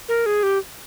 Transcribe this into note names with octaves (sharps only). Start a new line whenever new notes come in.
A#4
G#4
G4